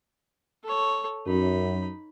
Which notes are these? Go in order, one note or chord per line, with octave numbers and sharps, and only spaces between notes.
A4 C#5
F#2 D#4 B5